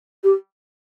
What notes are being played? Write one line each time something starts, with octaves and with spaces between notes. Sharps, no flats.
G4